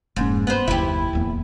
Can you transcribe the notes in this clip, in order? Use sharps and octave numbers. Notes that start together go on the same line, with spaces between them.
F1 G#2 A#3 C#4
G2 B3 C5
F#1 D#2 E4 G4
D1 E2 A#3